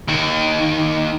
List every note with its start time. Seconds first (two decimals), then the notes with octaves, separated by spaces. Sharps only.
0.08 D#2 D#3